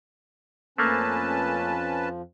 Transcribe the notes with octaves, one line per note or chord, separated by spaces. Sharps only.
F2 F3 A3 A#3 C#4 B4 A5